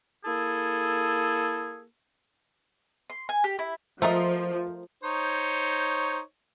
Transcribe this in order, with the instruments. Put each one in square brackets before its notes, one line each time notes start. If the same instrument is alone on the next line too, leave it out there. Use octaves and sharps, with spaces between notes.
[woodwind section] A#3 E4 G#4 A4
[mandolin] C6
G#5
G4
E4
[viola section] F3 [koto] A3 [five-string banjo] F4 A#4 D#5 [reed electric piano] C5
[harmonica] D#4 C5 C#5